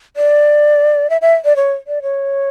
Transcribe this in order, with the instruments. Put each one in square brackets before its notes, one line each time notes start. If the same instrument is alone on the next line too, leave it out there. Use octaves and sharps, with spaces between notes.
[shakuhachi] D5
E5
E5
D5
C#5
D5
C#5